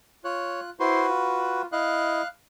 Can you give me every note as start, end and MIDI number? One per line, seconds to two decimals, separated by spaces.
0.24 0.70 65
0.24 0.60 73
0.24 0.70 90
0.80 1.06 64
0.80 1.62 66
0.80 1.62 71
0.80 1.06 72
0.80 1.06 84
1.09 1.66 65
1.72 2.22 64
1.72 2.22 75
1.72 2.27 77
1.72 2.27 90